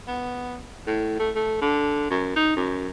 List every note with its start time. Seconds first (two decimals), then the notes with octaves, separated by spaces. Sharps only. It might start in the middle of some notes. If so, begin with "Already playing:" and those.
0.07 B3
0.87 A2
1.19 A3
1.35 A3
1.61 D3
2.10 F#2
2.36 D#4
2.56 F#2